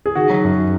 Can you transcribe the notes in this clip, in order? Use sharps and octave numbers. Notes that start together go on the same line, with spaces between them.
G#4
D#3 F#4
F#3
F#2